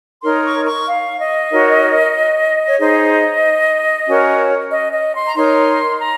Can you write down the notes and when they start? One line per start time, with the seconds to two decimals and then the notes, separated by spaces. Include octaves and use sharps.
0.22 D#4 A#4 C#5 C6
0.44 C#6
0.65 C#6
0.86 F5
1.19 D#5
1.50 D#4 F#4 A#4 C#5
2.67 C#5
2.79 D#4 G#4 C5 D#5
4.07 C#4 F#4 A#4 C#5
4.71 D#5
4.93 D#5
5.14 C6
5.26 A#5
5.35 D#4 A#4 C#5 C6
6.00 A#5